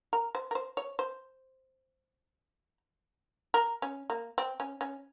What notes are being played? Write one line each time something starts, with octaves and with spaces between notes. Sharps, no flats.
A#4
C5
A#4
C5
C#5
C5
A#4
C#4
A#3
C4
C#4
C#4